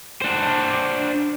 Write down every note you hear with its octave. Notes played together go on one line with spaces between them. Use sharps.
D4 C5